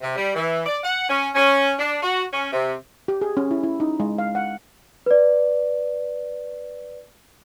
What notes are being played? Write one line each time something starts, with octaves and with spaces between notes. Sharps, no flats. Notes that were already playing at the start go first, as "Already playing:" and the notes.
C3
G3
E3
D5
F#5
C#4
C#4
D4
F#4
C#4
C3
G4
G#4
C#4
E4
E4
D#4
G#3
F5
F#5
B4 D5